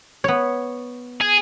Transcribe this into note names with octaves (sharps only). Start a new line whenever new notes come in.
B3 C#5
G#4